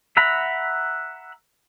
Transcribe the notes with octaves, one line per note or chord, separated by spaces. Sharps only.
E5 F#5 A#5 B5